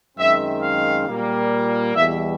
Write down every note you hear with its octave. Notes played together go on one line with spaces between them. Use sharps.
F#2 D#3 G#3 C4 E5
F5
A#2 G3 A#3
E2 B2 G3 E5